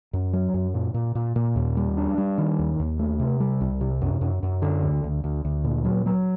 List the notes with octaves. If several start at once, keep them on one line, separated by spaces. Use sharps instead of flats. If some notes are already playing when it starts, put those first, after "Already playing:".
F#2
F#3
F#2
A#2
A#2
A#2
A#2
D#2
G3
D4
G3
D#3
D#2
D#2
A3
C3
G3
C2
C3
F#2
F#2
F#2
D3
D2
D2
D2
D2
A#2
F#3
F#3